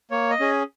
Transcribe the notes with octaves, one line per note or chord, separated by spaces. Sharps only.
A#3 C#5
D#5
C#4 G#4